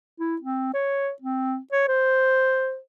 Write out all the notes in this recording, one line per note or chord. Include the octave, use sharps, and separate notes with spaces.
E4
C4
C#5
C4
C#5
C5